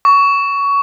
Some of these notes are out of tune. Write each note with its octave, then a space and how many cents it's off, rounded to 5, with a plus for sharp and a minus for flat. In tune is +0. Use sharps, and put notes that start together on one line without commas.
C#6 +20